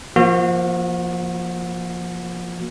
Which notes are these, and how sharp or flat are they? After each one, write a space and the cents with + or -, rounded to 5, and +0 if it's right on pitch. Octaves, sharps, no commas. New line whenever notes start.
F3 +0 A#3 +20 F#4 -30